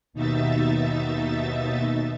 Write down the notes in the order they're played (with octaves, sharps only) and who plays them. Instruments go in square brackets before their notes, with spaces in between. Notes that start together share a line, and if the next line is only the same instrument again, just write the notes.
[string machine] D#2 B2 D#4 E5 A6